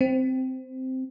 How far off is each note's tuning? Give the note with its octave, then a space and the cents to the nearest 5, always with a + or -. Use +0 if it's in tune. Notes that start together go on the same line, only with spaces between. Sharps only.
C4 -10